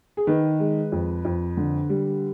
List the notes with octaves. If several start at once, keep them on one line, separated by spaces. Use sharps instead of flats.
G#4
D#3 B4
G#3
F2
F2
D3
G3